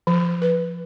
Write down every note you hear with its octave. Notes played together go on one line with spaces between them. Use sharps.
F3
B4